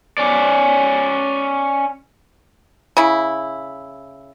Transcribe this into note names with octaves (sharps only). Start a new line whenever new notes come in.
C#4 D5
C#3 E4